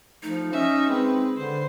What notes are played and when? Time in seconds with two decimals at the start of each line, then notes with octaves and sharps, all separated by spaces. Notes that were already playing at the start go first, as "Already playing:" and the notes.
0.23 F3 A3 D#4
0.52 C#4 D#5 E5
0.89 G#3 C4 B4
1.36 D3 B4 C5